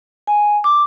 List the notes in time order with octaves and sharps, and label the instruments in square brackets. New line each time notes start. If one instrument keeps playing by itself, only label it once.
[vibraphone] G#5
D6